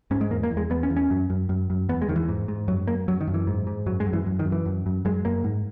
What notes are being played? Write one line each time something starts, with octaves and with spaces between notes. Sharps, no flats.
G#2 C#4
G#3
E2 A#3
A#3
E2
G#3
E2 B3
C#4
E2
C#4
F#2
F#2
F#2
F#2
E2 B3
G#3
E2 D#3
E3
G#2
G#2
F#2 F#3
F#2 A#3
F#2 F#3
D#3
F#2
E3
G#2
G#2
F#2 F#3
G#3
F#2
E3
F#2
D#3
F#2
E3
F#2
F#2
F#2 G#3
F#2 A#3
G#2